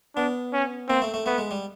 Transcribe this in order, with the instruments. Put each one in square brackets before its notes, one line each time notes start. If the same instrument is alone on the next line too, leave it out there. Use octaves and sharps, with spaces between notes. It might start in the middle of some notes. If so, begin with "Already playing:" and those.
[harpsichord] B3 [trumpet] D4
[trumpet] C#4
[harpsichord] A#3 [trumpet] C4
[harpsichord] A3
A3
[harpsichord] A3 [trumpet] B3
[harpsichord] G#3
G3